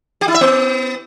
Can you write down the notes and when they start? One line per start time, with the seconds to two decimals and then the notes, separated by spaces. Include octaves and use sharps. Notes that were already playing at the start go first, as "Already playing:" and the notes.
0.21 G4
0.28 E4
0.34 E5
0.41 B3